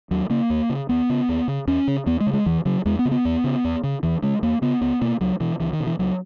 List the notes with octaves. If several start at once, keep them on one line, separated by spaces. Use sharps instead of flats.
D#2 F#3
C#3 A#3
D#2
C#3
D#2 B3
C#3
D#2
C#3
E2 C#4
C#3
E2 B3
G#3
C#3
G#3
E2 E3
C#3 F#3
E2 G#3
B3
C#3
B3
E2
C#3
E2
C#3
E2 E3
C#3 G#3
E2 A#3
C#3 B3
C#2 B3
B2 A#3
C#2 F#3
B2 E3
C#2 E3
D#3
B2
E3
C#2 F#3